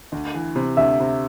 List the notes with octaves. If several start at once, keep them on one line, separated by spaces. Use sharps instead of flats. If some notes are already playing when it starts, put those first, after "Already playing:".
D2
E3
C3
D2 E5
C3